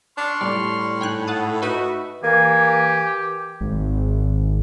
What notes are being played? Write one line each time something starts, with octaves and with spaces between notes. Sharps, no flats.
D4 C6 C#6 F6
A2 G3 D5
G#2 G5 G#5 F#6
E5 F#5 A5 D#6
D#4 F#4 B4
E3 A#3 G4 G#5
G#1